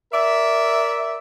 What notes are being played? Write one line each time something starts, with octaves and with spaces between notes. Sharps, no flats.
A#4 D5 E5